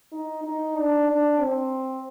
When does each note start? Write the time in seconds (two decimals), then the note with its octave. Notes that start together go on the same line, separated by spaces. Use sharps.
0.12 D#4
0.44 D#4
0.76 D4
1.08 D4
1.40 C4